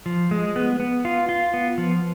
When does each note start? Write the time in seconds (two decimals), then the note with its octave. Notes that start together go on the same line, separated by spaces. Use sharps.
0.06 F3
0.31 G#3
0.56 B3
0.80 B3
1.05 F4
1.29 F4
1.54 B3
1.78 F3